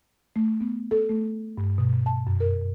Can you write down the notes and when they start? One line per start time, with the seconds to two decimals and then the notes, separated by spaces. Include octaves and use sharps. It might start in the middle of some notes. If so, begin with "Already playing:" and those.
0.36 A3
0.61 B3
0.91 A4
1.09 A3
1.58 G2
1.78 B2
2.06 A5
2.27 F#2
2.40 A#4